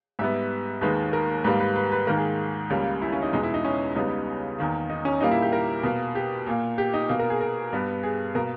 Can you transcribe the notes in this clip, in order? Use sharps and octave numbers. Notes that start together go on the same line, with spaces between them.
G#2 G3 B3 E5
D#2 D#3 G#3 B4
A#4
G#2 G3 A#3 B4
B4
B4
B4
G#2 D#3 A#3 A#4
G#4
C#2 C#3 G3 A#3
E4
C#4
D#4
E2 B2 G#3 D#4
E4
D#4
C#4
C#2 C#3 G3 B3 D#4
E2 D#3 A#3
D#4
C#4
A#2 G3 A#3 D#4
E4
G4
A#4
B2 A#3
G4
A#2 A#3
G4
D#4
B2 A#3
A#4
G#4
A#4
G2 G3 B3
G#4
B2 A#3 A#4